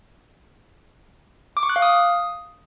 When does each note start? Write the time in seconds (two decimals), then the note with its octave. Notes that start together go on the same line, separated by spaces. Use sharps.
1.57 D6
1.63 C#6
1.69 F#6
1.76 F5
1.82 D#6